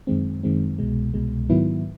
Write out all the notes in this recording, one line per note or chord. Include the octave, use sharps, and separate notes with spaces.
F#2 D#3 G#3 C4
F#2 D#3 G#3 C4
C2 B2 G#3
C2 B2 G#3
G#2 D#3 F#3 B3 E4